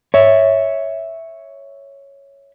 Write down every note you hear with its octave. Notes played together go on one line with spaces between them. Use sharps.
C#5 E5